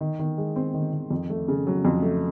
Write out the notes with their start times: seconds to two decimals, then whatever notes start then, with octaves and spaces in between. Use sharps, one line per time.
0.01 D#3
0.19 D#3
0.38 G#3
0.56 C4
0.74 D#3
0.93 D#3
1.11 F2
1.30 A3
1.48 C#3
1.67 F#3
1.85 F2
2.02 A3